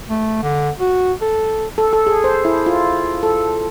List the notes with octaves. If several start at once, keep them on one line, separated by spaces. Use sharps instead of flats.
A3
D3
F#4
A4
A4
A4
G#4
C5
E4
F4
A4